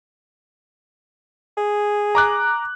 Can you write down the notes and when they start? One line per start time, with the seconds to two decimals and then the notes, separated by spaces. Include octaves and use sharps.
1.57 G#4
2.15 A#5 D6 F#6